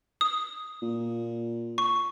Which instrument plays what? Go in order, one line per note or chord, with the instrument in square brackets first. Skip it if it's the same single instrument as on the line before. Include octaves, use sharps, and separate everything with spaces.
[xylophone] D#6
[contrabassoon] A#2
[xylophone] C#6